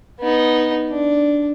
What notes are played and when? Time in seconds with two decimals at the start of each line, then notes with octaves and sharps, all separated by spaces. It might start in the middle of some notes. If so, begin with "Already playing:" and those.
0.20 B3 D#4
0.90 D4